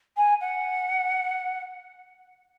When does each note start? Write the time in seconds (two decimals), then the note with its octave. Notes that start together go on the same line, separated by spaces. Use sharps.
0.17 G#5
0.41 F#5